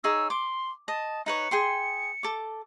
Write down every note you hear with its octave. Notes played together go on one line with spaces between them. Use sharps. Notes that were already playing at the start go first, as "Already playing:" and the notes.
D#4 G#4 C#5 E6
C6 D6
D#5 A5
D#4 B4 C#5 C#7
G#4 G5 C6
A4 D6